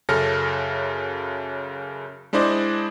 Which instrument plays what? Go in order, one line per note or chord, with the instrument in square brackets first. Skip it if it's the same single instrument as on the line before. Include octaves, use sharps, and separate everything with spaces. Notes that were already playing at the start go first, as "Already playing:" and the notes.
[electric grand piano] F#2 C#3 A4 F6 A#6
G#3 D4 E4 C5 D5 D#5